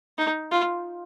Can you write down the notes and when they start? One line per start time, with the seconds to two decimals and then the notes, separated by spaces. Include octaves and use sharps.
0.18 D#4
0.51 F4